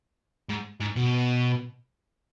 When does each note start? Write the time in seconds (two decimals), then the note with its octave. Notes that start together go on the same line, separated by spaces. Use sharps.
0.50 G#2
0.81 G#2
0.96 B2